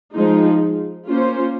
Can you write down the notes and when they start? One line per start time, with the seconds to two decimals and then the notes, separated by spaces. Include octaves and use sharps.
0.15 F3 G#3 D#4
1.08 A#3 C#4 F4 C5